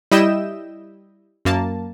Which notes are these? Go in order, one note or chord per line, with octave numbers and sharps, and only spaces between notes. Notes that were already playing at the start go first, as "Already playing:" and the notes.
G3 E4 D#5 E5 G5 E7
F#2 A#3 A5